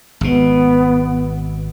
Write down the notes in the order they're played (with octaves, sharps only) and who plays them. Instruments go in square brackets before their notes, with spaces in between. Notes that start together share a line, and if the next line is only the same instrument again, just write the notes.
[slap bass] G#1 B2 [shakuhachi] B3